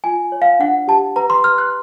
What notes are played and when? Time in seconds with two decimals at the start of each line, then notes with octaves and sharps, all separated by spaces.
0.04 F4 G#5
0.32 C#5
0.42 F5
0.59 D4 F#5
0.88 G4 A5
1.16 B4 A#5
1.30 C6
1.44 B4 F6
1.58 F#6